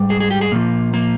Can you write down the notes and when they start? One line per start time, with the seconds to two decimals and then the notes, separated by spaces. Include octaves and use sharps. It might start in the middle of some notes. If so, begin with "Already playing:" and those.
Already playing: G#2 G3
0.10 G#4
0.20 G#4
0.31 G4
0.41 G#4
0.52 A#2 F3 A#3
0.94 A#3